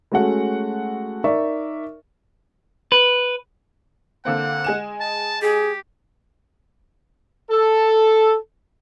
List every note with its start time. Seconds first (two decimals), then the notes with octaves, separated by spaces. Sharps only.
0.12 G#3 A3 C#4 F#4 A4 F#5
1.24 D#4 A#4 D5 E5 C#6
2.92 B4
4.25 D3 A#3 C4 F#5
4.64 G#3 G#5 E7
5.01 A5
5.42 G4 G#4
7.51 A4